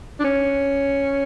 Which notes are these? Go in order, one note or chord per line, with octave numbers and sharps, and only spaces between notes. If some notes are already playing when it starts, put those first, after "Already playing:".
D4
C#4